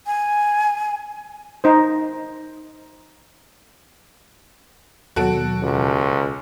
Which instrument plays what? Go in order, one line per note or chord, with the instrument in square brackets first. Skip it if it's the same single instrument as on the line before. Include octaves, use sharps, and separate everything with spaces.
[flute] G#5
[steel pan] D#4 C5
[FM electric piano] D#2 B2 F#3 [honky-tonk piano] F#4 A4 D7
[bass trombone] C#2